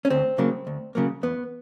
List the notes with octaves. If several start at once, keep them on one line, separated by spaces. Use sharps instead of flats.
C#4
D2 C4
C#3 F#3 A#3
D2
C#3 F#3 A#3
E2 B3